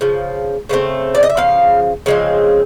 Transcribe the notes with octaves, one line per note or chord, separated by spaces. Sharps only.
C#3 F3
C#3 F3 A3 C4
D5
D#5
E5
C#3 F3 F5
C#3 F3 G#3 C4